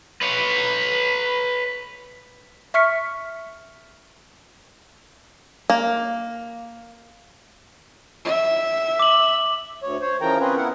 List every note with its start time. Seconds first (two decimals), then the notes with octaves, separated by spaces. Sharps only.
0.22 B4 C#5
2.74 E5 C#6 F6 B6 C#7
5.70 A#3
8.25 E5
8.99 D6 F#7
9.83 D2 C#5
10.01 C5 C#5
10.21 C#3 E3 F3 A#4 G5 A#5
10.40 C4 C#4 F4 G#4 B4
10.56 B3 E4 A#4 F#5